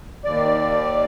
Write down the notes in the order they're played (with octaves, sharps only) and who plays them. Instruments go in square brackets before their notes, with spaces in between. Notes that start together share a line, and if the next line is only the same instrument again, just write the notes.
[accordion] D#2 D5